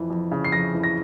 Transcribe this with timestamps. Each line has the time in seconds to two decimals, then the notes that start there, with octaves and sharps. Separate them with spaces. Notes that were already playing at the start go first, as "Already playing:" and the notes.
Already playing: F2 E3
0.10 F2
0.32 C#3
0.45 C7
0.52 F2 A#6
0.74 E3
0.83 A#6